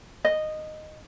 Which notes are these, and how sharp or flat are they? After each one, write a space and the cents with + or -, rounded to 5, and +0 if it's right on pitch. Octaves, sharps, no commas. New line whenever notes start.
D#5 -10